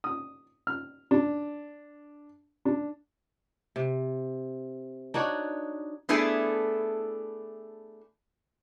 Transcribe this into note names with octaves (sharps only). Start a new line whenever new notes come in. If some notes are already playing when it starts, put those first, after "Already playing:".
D#6
F6
D4
D4
C3
D4 D#4 F#4 C#5
A3 B3 D4 E4 G#4 A4